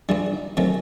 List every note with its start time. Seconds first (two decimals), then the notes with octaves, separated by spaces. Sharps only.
0.09 G2 E3 G3 D4
0.33 D#4
0.57 D#3 F#3 A3 C4 C#4